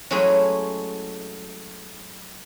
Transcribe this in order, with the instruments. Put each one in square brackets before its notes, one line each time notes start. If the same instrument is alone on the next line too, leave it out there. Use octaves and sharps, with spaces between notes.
[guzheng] F#3 G#3 A3 C#4 E4 G#4